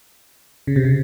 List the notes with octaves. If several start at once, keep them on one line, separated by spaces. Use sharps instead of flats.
C#3
C3
C#3